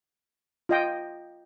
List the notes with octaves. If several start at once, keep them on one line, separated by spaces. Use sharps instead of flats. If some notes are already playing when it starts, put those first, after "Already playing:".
F4 D#5 G5